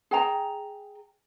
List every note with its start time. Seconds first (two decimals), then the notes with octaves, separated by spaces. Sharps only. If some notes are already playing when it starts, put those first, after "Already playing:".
0.11 G#4 G5 A#5